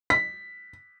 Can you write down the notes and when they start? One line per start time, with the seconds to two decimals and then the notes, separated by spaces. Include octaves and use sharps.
0.10 B6